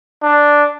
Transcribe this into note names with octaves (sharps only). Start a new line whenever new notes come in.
D4